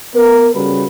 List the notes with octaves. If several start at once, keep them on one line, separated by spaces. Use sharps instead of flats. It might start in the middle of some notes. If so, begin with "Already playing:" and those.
B3 A#4
C#3 G3 F#4 B4